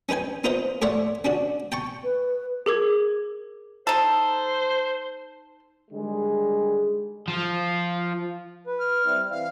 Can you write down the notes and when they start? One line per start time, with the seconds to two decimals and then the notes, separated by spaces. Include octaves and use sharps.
0.09 C#4 D#4 B4 G5 G#5
0.44 D#4 F4 B4 C5 D#5 A#5
0.82 A2 C#5 D5 E5 F#5 C6
1.25 C#4 D4 F#4 D5
1.72 G5 A5 C#6
2.04 B4
2.66 G#4 A#4 D6 G#6
3.87 D#4 A4 C5
5.91 D3 D#3 G3 G#3
7.28 F3 F4
8.67 B4
8.79 F6
9.05 G3 C4 E4
9.30 E3 F5